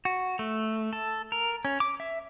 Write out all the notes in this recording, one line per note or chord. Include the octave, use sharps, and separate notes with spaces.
F#4
A3
A4
A#4
C#4
D6
E5